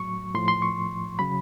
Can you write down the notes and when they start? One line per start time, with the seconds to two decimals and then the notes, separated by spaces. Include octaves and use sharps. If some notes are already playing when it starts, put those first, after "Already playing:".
Already playing: A2 F#3 C#6
0.34 A2 F3 C6
0.48 C6
0.62 C#6
1.19 C#3 F#3 B5